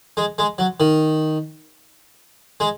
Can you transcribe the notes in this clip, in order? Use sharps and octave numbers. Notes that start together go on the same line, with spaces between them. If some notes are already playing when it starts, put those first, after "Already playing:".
G#3
G#3
F#3
D#3
G#3